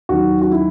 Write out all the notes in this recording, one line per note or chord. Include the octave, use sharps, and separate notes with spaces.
D#2 D#3 F#3 F#4
F#4
E4